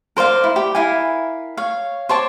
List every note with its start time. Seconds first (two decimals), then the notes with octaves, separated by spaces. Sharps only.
0.17 A#4 C5 D5 F5
0.44 E4
0.56 G4
0.75 E4 A#4 F5 G#5
1.57 C#5 F5
2.09 C5 C#5 A5 D6